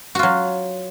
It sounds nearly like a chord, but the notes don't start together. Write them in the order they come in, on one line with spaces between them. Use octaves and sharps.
F#4 F4 F#3